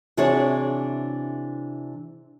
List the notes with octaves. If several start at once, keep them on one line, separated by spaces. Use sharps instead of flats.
C3 E3 D4 F#4 G#4 C#5